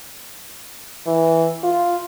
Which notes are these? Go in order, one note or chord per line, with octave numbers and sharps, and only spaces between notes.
E3
F4